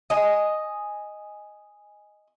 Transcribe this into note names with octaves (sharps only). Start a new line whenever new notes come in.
D#5 G#5